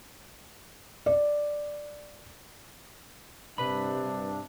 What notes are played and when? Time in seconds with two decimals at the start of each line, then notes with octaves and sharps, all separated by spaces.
1.06 D5
3.58 G2 C3 D4 B4 B5